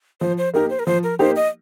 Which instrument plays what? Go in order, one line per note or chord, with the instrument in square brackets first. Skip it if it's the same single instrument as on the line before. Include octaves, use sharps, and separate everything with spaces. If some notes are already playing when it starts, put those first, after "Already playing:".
[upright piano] F3 [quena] C5
[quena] C5
[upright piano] A#3 D#4 G4 [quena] A#4
[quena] C5
A#4
[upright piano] F3 [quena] C5
[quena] A#4
[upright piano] A#3 D#4 G4 [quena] C5
[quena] D#5